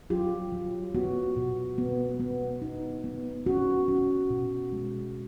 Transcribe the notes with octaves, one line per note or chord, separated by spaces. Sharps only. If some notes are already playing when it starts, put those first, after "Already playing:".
F#3 F4 G4
F#3
B3 F#4
B2
B3
B3
D#4
B3
C#4 F#4
C#4 F#4
B2
G#3